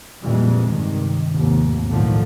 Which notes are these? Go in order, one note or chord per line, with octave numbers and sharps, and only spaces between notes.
F2 A#2 E3 G3 G#3
G2 C3 D#3
F1 D#2 G#2
B1 A2 D3 D#3 F3 A3